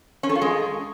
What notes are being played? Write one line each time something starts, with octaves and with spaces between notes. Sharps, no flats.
C#4
A4
F4
G#3